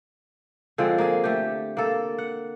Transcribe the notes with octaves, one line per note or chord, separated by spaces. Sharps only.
D3 F3 G#3 C4
A#3 G#4
A3 G4
A#3 A4
F#5